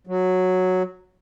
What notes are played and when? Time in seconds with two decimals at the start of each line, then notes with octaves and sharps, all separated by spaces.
0.07 F#3